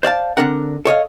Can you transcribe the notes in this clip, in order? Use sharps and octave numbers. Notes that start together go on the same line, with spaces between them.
C5 D5 F5 A5
D3 C4 D4 A#4 F#5
A4 C#5 D#5 F5